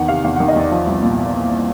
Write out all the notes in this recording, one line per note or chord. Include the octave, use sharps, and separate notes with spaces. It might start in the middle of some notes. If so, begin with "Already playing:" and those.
Already playing: E2 D#3 F#5
C3 F5
E2 F5
D#3 F#5
D#5
E2 D5
F3
C2
A#2